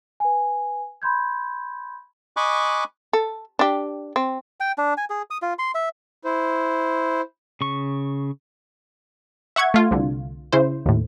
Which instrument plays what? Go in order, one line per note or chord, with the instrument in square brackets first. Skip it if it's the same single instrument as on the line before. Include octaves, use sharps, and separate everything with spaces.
[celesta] B4 G#5
B5 C6 G6 G#6
[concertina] D#5 G#5 B5 C#6 D6 F#6
[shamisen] A4
D4 G4
C4
[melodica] G5
D4
G#5
G#4
D#6
F4
C6
E5
[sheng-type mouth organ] E4 C5
[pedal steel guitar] C#3 C#6
[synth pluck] E5 F#5 C#6 G#6
A3 F4
C2 D3
C#3 E4 C5
D#2 A2